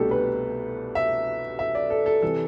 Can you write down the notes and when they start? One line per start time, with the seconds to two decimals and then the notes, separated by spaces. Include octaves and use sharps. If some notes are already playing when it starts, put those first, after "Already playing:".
Already playing: C2 B2 A3 D4 G4 A4
0.11 B4
0.95 E5
1.59 E5
1.75 D5
1.90 A4
2.06 A4
2.22 C3 E3 A4